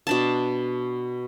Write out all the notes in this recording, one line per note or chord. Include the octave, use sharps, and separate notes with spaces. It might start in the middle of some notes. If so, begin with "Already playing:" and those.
B2 D4 A5